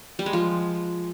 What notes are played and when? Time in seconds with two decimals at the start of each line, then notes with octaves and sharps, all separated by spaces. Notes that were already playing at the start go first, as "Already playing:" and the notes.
0.19 G3
0.26 G#3
0.33 F3